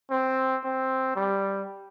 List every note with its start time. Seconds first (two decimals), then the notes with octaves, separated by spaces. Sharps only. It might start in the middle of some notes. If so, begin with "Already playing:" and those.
0.11 C4
0.64 C4
1.16 G3